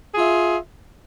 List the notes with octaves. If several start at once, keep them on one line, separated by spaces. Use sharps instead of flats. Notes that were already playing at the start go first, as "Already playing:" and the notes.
F4 G#4 E5